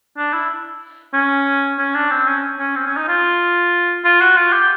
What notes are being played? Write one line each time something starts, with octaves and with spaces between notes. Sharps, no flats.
D4
E4
C#4
C#4
D4
C4
C#4
C#4
C4
C#4
D#4
F4
F4
F#4
F4
G4